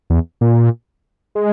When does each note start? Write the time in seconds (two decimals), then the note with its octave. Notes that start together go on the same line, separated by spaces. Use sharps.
0.10 E2
0.41 A#2
1.35 G#3